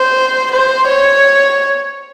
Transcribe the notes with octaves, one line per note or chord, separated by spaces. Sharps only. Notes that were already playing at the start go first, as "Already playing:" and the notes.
Already playing: C5
C5
C#5